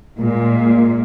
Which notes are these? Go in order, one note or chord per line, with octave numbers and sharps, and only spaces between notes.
A#2 G#3